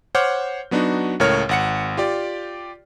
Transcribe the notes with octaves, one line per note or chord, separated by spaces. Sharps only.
C5 C#5 F#5 D6 F6 G6
F#3 B3 D4 D#4 F#4
C#2 A2 A#4 C#5 F6
G#1 F#5 C#7
F4 G4 D5